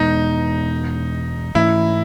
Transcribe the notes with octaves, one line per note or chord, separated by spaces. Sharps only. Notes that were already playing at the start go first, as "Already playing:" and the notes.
Already playing: E2 B2 G#3 B3 D#4
G#2 E3 A3 C#4 E4